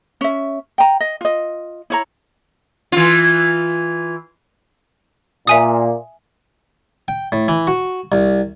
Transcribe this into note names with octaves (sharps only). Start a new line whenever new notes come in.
C#4 E5
G5 A#5
D#5
F4 D#5
E4 C#5 A#5
E3 F4
A#2 E5 G#5 D#6
G5
A2
E3
F#4
C2